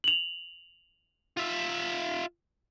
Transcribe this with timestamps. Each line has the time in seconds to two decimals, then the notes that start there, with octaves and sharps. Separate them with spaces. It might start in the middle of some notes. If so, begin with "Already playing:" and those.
0.04 F7 F#7
1.37 F4 E5